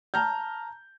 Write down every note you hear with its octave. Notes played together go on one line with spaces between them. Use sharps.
A5 A#5 F6 G6